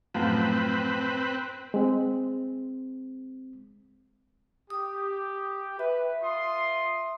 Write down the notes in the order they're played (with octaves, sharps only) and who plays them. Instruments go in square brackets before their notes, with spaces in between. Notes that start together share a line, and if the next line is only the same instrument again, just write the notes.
[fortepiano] F#2 A2 F3 [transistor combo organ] C4 B4
[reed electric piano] G#3 C4
[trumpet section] G4 [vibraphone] D#6
[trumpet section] B4 [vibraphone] E5
[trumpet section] F4 C6 D#6